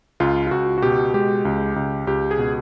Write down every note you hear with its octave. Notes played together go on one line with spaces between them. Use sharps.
C#2 F4
F4
C#2 F#4
F#4
B2 G4
G#3 G4
C#2
C#2
C#2 G4
G#4
B2